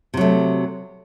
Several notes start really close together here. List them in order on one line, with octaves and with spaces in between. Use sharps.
C3 F#3 A3